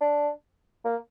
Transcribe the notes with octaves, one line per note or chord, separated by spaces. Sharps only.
D4
A#3